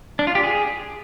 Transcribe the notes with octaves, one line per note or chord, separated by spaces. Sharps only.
D4
F4
G4
G#4